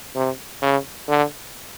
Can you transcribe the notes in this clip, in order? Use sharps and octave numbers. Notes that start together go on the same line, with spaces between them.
C3
C#3
D3